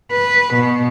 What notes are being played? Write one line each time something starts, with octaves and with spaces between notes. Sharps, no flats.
B4
B2